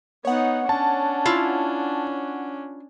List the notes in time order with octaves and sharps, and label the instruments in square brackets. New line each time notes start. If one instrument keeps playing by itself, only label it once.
[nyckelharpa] B3 D#4 [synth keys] C#5 F#5
[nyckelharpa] C#4 D4 [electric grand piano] A5
[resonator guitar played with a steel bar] E4 F4